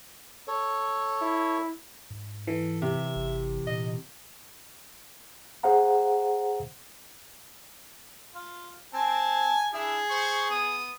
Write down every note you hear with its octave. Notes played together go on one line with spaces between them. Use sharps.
A4 C#5
E4
G#2
E3 A4
C3 E5
G1
A#2 D#5
G#4 C5 F5 F#5 A#5
F4
C4 G#5 A5
D4 E4 G#4 E5
C5 C#6
B3 D#6